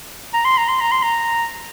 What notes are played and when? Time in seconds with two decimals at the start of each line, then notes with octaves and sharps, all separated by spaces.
0.34 A#5
0.45 C6
0.58 A#5
0.69 C6
0.80 A#5
0.92 C6
1.03 A#5